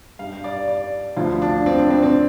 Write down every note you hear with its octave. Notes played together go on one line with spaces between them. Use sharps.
G2 G3 F5
D5
D5
D2 D3 F3 F4
D4
C4
D4
C4
C4